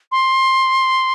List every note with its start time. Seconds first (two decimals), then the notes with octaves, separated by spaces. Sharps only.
0.12 C6